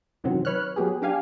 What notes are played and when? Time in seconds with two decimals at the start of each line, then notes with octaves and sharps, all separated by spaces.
0.24 F#2 C3 D#3 E3 F#3 C4
0.45 B4 C#5 F6 F#6
0.76 F#3 B3 G4 G#4
1.02 D4 G4 F5 G#5